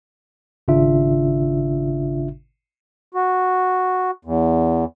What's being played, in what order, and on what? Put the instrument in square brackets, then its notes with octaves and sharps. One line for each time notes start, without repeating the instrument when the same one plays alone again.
[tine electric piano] G#1 C#3 D4 F4 E5
[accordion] F#4
E2